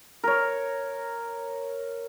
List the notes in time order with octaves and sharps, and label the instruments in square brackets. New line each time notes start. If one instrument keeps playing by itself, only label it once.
[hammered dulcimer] A#4 C#5